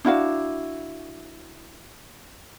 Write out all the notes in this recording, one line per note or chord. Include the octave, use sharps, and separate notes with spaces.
D4 E4 F#4 F5